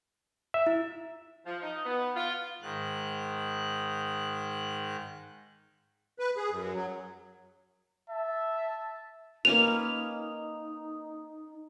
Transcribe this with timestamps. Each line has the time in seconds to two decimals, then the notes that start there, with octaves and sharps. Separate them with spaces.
0.54 E5
0.67 E4
1.45 F3
1.62 D#4
1.85 B3
2.15 F4
2.62 G#2 D#3 F#6
6.19 B4
6.37 G#4
6.50 F#2
6.73 F#3
8.10 E5 A5
9.45 A#3 C#4 D#4 B4 F7